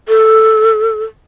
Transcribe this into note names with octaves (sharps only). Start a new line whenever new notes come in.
A4